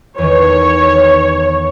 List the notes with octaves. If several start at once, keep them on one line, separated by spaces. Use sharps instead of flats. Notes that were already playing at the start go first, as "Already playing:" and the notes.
E2 D#3 C#5